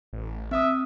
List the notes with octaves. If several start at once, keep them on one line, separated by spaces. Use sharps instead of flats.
A1
C4 E5 D#6